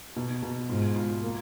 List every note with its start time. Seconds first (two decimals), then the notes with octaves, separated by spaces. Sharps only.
0.16 B2
0.43 B2
0.69 G#2 F4
0.96 F4
1.23 A#3